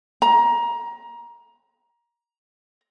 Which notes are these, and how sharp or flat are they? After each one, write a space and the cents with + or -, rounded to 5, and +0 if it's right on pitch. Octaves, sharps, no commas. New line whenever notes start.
A#5 +20